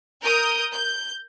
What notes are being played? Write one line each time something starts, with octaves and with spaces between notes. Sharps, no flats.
A#4 D#6 G6
G6